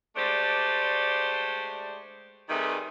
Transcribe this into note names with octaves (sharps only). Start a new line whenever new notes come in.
G#3 A3 D4 G4 C5 D5
C3 D#3 G3 A3 G#4 B4